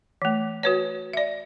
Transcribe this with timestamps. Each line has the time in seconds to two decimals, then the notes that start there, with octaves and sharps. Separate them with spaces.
0.22 E3 A3
0.63 F#4 B4 C#5
1.13 D5 E5